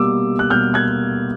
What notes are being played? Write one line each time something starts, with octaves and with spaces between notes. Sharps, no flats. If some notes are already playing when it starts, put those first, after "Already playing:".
Already playing: B2 G3 A#3 D6 E6
F#6
B2 G3 A#3 F6 G6
F#6 G#6